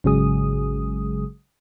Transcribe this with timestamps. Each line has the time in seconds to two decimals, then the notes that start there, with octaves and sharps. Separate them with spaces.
0.04 G#1 C#3 F#3 G#3 G#4 D#6